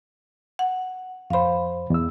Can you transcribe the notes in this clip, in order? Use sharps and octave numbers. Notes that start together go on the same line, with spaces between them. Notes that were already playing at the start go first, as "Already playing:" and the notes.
F#5
F2 C5 F5 B5
E2 E6